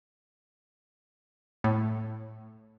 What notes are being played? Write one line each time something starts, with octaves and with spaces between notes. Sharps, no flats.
A2